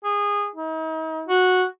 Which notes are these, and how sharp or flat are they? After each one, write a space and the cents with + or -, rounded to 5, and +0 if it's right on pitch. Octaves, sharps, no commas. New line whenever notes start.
G#4 -20
D#4 +40
F#4 -10